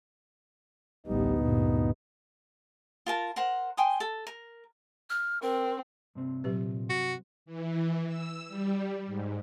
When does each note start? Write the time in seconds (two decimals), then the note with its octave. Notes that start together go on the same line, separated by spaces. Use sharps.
1.07 A1 D2 G3 B3 D#4
1.42 G2 A#2
3.06 F4 A#4 A5
3.36 A#4 C5 F#5
3.77 G5 G#5 C6 D#6
4.00 A4
4.27 A#4
5.10 F6
5.42 C4 A#4
6.15 G2 C3 C4
6.44 A#2 F#3 G4 B4
6.89 F#4
7.46 E3
8.07 E6
8.48 G3
9.06 G#2